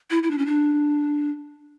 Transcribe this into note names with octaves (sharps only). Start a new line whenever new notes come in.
E4
E4
D4
C#4
D4